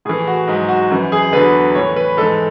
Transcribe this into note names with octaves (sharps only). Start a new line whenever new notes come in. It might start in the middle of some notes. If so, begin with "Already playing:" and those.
A2 E3 G#4
F#4
G#2 F#3
F#4
F#2 E3
G#4
E2 D3 F#3 B4
A2 E3 C#5
B4
G#2 E3 A4